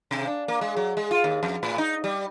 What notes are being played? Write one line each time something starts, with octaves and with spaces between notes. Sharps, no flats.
C3
D4
A#3
G#3
F#3
G#3
F4
D#2
F2
A2
D#4
G3